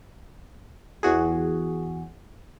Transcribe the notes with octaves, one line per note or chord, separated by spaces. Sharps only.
E2 F#4 G#4